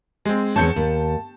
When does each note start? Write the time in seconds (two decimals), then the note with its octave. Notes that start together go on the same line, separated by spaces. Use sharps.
0.25 G#3 C4
0.56 E2 C4 C#5 A5 G6 C#7
0.76 D#2